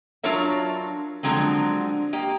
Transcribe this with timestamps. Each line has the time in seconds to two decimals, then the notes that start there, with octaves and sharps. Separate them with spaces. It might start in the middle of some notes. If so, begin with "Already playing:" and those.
0.23 F#3 D4 F4 A#4 C#5 E5
1.23 D3 F3 F#3 G#3 C4
2.13 A#3 G4 D#5